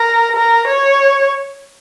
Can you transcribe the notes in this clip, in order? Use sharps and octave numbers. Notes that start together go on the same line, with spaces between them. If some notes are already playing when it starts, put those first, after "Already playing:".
Already playing: A#4
A#4
C#5